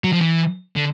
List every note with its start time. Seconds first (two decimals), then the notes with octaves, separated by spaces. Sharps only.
0.04 F#3
0.12 F3
0.21 E3
0.76 D3